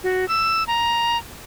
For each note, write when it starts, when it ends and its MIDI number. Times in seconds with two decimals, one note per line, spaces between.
0.04 0.28 66
0.28 0.63 88
0.67 1.17 82